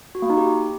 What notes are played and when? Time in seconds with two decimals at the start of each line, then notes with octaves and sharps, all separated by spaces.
0.15 F#4
0.22 A#3
0.30 D#4
0.37 G4